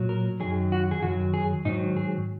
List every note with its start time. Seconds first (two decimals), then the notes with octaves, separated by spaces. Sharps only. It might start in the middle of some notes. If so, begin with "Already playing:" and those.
Already playing: A#2 F#3
0.09 A#4
0.40 F#2 D#3 F#3 G#4
0.72 F#4
0.91 G#4
1.02 F#2 D#3 F#3 F#4
1.34 G#4
1.65 G#2 D#3 F#3 D#4
1.97 G#4